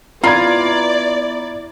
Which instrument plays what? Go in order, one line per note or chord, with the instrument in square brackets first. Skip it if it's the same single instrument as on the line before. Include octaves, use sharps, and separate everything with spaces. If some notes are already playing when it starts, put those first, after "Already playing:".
[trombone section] B3 E4 [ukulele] F4 [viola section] D5 [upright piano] A#5 B5 G#6